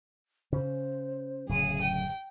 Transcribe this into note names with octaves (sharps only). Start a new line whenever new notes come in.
C#3 C#4 C5
D1 F#2 C#3 G#4 D#7
G5